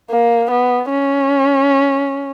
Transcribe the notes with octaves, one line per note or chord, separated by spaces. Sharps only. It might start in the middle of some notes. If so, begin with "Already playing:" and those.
A#3
B3
C#4